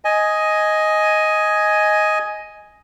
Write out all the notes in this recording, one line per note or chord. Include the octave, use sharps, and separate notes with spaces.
D#5 G#5